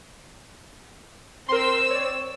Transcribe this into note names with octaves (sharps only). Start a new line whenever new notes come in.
C4 A#4 C6 E6
C#5 D5